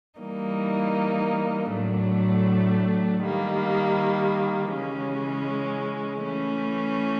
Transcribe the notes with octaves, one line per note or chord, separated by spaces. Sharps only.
E3 G3 A#3 D#4
A2 F#3 A3 D4
D#3 G3 A#3
C#3 E3 G#3 C#4
E3 A3 C#4